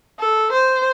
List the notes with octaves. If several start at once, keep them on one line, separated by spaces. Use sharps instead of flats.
A4
C5